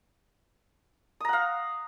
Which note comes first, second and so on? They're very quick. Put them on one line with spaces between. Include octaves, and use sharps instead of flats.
D#6 A#5 F#5 F5